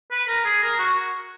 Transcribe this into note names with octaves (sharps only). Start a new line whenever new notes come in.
B4
A#4
G#4
A#4
F#4